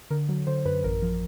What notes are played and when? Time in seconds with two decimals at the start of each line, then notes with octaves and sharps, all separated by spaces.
0.10 D3 A#4
0.29 F#3
0.47 D3 C5
0.65 F#2 B4
0.84 A1 A#4
1.02 F3